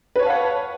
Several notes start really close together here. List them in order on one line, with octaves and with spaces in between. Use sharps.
B4 C#5 A5 F5 F#5